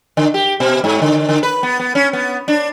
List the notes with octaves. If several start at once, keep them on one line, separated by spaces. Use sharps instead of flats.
D3
G4
B2
G#2
D3
D3
B4
B3
B3
C#4
B3
D4